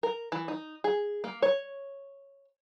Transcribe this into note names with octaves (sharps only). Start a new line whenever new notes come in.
A#4
E3
D#4
G#4
A#3
C#5